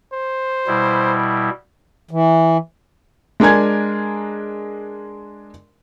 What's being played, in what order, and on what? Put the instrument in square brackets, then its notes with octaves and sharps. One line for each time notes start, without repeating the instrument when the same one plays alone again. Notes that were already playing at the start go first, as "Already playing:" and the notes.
[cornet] C5
[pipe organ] B2 G3 E4
[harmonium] E3
[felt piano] G#3 D4 A#4 G#5 G#6